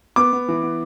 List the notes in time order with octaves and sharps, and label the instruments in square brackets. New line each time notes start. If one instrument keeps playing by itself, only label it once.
[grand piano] B3 [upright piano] D6
[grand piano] B3
E3
B3